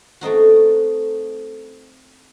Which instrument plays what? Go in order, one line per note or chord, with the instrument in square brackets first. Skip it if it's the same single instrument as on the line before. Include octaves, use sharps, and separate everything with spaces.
[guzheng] A3 C4 D#4 F#4